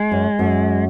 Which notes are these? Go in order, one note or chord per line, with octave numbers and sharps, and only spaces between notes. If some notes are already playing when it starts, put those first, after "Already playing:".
Already playing: G#3
F#2
F#2